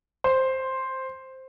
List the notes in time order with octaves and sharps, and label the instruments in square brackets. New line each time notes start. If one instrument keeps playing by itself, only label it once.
[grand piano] C5